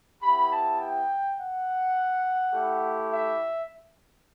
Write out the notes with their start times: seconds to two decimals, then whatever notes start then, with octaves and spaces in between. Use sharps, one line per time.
0.21 B3 E4 G4 B5
0.50 A5
0.79 G5
1.38 F#5
2.54 A3 E4 G4
3.11 E5